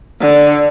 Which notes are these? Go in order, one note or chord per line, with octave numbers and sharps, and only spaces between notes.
D3